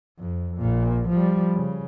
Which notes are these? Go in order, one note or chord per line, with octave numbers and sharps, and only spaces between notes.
F2
A#1 A#2
F3 G3
C#3